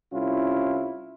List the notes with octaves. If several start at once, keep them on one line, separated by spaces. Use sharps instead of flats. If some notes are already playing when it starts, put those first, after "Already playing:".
C2 C#4 E4 F4